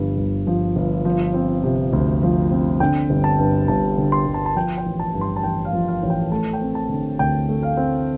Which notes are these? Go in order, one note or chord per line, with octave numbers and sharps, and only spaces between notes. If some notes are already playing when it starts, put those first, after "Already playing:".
Already playing: G1 G2 F3
G1
F3
G1
F3
C4
C3
D2
F3
C4
D3 G5
G1
A5
G2
G1 A5
D3
C6
G1
A5
A5
F3 G5
G5
A1
A5
G2
C6
A5
A1 G5
F5
F3
F5
A1
G5
A3 A5
G5
C4
A5
D3
D2 G5
A3
F5
C4